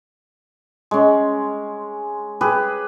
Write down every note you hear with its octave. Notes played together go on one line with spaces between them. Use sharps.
G#3 C#4
G4 G#4 B4